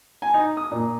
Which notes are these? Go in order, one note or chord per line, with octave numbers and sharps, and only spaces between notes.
G#5
D#4
D#6
A#2